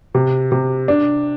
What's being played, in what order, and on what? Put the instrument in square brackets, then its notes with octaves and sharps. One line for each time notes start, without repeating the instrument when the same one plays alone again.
[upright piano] C3
C3
D4